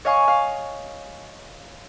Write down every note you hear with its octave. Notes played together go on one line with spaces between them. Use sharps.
C#5 D#5 F5 G#5 C#6
F5